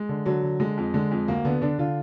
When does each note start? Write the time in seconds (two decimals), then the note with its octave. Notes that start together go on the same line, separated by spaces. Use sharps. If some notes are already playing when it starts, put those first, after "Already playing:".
Already playing: G#3
0.09 D3
0.26 D3 F#3
0.43 D3
0.60 D3 G#3
0.77 F2
0.94 D3 G#3
1.11 F2
1.28 D2 A#3
1.45 D3 B3
1.62 D3 D4
1.79 D3 F4